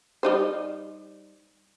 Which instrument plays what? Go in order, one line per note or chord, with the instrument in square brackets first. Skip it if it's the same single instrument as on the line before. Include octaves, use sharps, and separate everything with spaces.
[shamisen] G3 D#4 C5